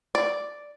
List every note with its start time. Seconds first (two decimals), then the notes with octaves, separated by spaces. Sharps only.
0.15 D5